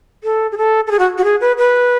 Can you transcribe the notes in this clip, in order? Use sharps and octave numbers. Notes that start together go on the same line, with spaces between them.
A4
G#4
A4
A4
G#4
F#4
F#4
G#4
B4
B4